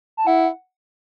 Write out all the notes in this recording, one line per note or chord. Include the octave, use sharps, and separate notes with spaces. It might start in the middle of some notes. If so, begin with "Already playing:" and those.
A5
E4 F#5